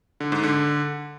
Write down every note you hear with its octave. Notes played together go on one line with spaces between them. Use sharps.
D3
G#2
D3